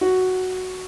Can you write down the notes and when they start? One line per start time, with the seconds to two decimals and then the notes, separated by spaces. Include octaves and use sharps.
0.01 F#4